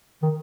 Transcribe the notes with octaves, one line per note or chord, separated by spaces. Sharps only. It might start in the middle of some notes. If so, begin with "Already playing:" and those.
D#3